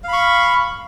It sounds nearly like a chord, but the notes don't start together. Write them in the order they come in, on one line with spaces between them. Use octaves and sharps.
F5 B5 C#6